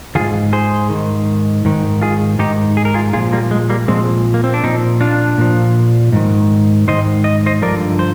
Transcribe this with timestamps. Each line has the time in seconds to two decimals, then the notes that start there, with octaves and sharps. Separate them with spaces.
0.15 G#2 D#3 F4 G#4
0.53 G#4 C5
0.90 G#2 D#3
1.65 G#2 D#3
2.02 F4 G#4
2.39 G#2 D#3 D#4 G4
2.77 G#4
2.85 A#4
2.94 F4 G#4
3.13 A#2 F3 F4 G#4
3.33 G3 A#3
3.51 G#3
3.70 G3 A#3
3.88 A#2 F3 G#3 C4
4.34 A#3
4.44 C4
4.54 D4
4.64 A#2 F3 C4 D#4
5.01 D4 F4
5.38 A#2 F3
6.12 G#2 D#3
6.88 G#2 D#3 C5 D#5
7.24 D#5
7.46 C5 D#5
7.62 G2 D3 F3 A#4 D5
7.99 C5